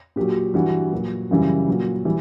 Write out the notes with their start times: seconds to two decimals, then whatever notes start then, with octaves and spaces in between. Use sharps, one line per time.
0.16 A#2 F#3 G4
0.54 G2 E3 G3 F#4
0.92 A#2 F#3
1.31 F#2 C#3 E3 G3
1.68 A#2 F#3
2.05 E3 G3